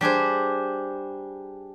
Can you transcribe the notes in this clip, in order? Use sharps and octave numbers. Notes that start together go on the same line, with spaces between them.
G3 D4 G#4 C5